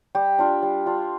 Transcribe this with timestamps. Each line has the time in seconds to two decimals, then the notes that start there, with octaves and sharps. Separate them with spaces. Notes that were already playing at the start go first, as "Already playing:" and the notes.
0.15 G3 G4
0.39 D4 F4
0.63 G3
0.86 D4 F4